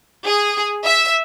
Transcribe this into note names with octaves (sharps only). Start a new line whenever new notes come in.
G#4
E5